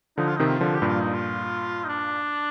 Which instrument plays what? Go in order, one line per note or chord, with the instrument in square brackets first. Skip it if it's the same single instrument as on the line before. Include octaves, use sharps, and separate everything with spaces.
[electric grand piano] D3 F3 [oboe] D#4
[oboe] F4
[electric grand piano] C3 D#3 [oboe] D#4
[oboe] F4
[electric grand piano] D3 F3
[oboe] G4
[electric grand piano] G2 A#2
[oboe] F4
D#4
F4
D#4
D4